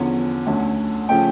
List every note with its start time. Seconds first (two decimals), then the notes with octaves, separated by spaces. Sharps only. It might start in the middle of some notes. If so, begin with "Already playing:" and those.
Already playing: E2 D3 F3 C#4
0.47 D2 D3 A3 C#4
1.09 C#3 F3 A3 C#4 G5